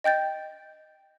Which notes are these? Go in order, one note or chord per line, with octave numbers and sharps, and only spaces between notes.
D#5 G5 G6 A6